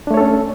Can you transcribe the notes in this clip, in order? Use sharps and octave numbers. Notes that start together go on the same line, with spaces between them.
A3 C#4 D4 A4 C#5